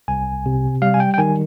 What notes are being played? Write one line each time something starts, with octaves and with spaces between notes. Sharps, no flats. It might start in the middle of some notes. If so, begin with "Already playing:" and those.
C2 G#5
C3
G3 F5
G#5
G5
G5
D#3 G#5